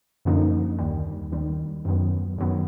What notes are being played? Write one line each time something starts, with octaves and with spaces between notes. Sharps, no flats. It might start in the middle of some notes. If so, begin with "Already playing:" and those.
F#2 D3 F3 A#3 D#4
D#2 D#3 G3
D#2 D#3 G3
F#2 D#3 F#3 B3
F#2 D#3 F#3 B3